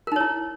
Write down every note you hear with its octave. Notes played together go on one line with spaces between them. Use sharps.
D#4 E4 A#4 C#5